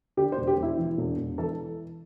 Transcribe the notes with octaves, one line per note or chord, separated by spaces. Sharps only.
D3 G4
C5
E1
G4
E1
E4
E3
E1
E1
E3 A4